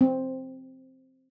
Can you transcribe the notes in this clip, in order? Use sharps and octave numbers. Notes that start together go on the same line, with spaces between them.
C4